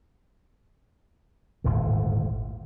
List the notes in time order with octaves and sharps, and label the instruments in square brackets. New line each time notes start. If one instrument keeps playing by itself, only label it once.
[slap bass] D#1 G#1 A2 D3